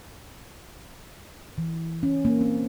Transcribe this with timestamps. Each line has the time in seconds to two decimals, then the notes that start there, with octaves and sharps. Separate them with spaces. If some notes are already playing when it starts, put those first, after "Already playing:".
1.58 E3
2.03 C#4
2.25 A#3
2.41 C4